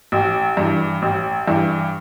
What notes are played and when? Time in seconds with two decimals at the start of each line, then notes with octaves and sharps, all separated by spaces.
0.12 A1
0.57 G2 E3
1.02 A1
1.47 G2 E3